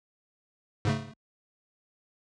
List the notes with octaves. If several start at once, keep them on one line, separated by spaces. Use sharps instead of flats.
G#2 C#3 A3